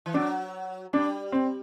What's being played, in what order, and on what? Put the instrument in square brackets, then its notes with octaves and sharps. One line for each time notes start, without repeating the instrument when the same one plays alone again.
[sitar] E3
[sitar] F#3 [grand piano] D4
[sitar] G3 [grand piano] D4
[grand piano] C4